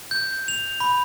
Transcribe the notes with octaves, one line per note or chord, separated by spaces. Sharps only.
G6
F7
B5